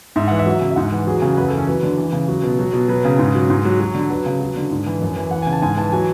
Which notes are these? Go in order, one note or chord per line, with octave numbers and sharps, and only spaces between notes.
G#2 E5
E3 F#5
E5
F#3
C#3
E5
G#2 F#5
E3
F#3 G#4
F#4
C#3
G#4
F#2 B4
A4
E3
C#4
F#3 B4
D3
E3
C#3
F#3
B2
F#3
B2
F#3 B4
C#3
G#2
F#3
G#2
F#3
F#3
D3
F#3 B4
C#3
F#3
D3
G#2
E3
F#2
E3
E3 F#5
G#5
C#3
A5
G#2 G#5
E3 A5
F#3 G#5